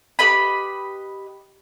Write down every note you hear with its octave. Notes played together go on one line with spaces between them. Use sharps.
G4 B4 D#5 B5